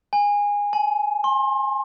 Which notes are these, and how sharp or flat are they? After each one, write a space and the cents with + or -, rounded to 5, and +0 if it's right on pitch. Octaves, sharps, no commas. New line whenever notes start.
G#5 -20
G#5 +35
C6 +35